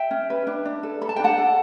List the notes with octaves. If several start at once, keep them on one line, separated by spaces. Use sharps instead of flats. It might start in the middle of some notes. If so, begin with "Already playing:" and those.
Already playing: E5 G5
C#4
B4
D4
D4
A4
A4 B5
A5
G5
D4 F#5 A5
A4